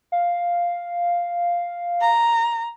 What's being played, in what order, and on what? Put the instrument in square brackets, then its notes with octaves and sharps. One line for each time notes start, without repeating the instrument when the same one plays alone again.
[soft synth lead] F5
[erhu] A#5